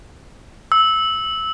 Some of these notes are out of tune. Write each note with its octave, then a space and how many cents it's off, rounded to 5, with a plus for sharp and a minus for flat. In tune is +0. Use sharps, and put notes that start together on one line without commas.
E6 -15